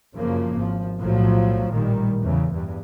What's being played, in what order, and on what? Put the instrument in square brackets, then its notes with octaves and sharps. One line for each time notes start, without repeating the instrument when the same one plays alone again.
[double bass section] F#2 C#3 F3 A#3
G#1 F3
B1 A2 F3 F#3
A1 A#2 D#3 G3
E2 C#3
E2 G2